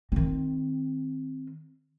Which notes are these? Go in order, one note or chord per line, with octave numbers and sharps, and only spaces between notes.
D#3 C4